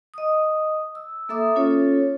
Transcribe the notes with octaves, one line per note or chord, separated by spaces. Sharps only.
D#5 D#6
E6
A#3 A4 E5 D6 D#6
C#4 F4 A4 C#5